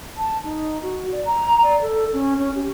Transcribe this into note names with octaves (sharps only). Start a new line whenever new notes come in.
A5
D#4
F#4
D5
A#5
D5
A4
C#4
C#4
G4